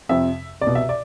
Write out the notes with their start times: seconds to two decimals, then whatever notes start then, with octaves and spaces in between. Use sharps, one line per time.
0.09 F2 C3 F3 E5
0.61 C2 D5
0.67 B2
0.75 E5
0.89 D5